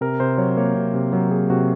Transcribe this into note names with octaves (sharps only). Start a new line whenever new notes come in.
C3 A#4
C3 C5
F#3 C#5
A#3 C#5
C3
C3
F#3 A#4
A#3 G#4
C3 F#4